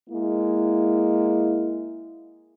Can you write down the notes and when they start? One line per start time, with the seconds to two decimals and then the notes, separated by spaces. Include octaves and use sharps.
0.10 G#3 A#3 E4